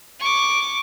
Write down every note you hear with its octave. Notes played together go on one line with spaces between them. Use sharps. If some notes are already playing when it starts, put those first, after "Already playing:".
C#6 D6